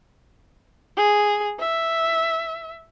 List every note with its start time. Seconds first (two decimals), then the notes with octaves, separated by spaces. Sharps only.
0.97 G#4
1.60 E5